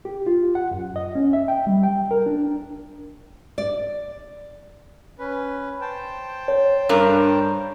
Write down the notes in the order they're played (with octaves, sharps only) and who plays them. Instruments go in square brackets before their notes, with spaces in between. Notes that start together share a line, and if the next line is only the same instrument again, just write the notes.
[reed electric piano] G4
F4
F#5
F#2
D#5
C#4
E5
G5
G3
G5
A#4
D4
[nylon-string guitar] D5
[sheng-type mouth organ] C#4 B4
C5 G5 A5
[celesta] C#5
[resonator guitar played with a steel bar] G2 G3 A#4